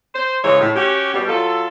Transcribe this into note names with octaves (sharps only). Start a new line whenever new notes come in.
C5
G#2 C#3 E3 D#4 C#5
A2
C#4 F#4 G4
B2 G3
F#3 F4 A4